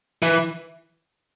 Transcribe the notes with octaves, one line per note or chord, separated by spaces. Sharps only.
E3